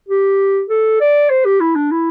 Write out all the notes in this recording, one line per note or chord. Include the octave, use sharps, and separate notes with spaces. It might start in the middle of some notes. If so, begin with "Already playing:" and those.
G4
A4
D5
C5
G4
E4
D4
E4